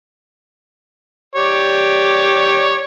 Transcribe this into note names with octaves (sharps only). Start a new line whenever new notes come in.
G4 C#5 D5